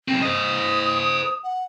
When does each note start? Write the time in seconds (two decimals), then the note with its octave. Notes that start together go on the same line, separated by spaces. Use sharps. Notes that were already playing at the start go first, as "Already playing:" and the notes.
0.08 B1 C4
0.22 C5 D#5 D#6
1.43 F#5